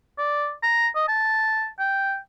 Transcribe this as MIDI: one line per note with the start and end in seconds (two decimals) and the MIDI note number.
0.18 0.52 74
0.63 0.88 82
0.96 1.06 75
1.08 1.68 81
1.79 2.18 79